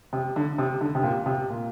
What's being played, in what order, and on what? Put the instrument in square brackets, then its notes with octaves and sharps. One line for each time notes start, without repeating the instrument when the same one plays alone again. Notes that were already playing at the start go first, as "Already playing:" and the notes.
[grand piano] C3
D3
C3
D3
C3
A#2
C3
A#2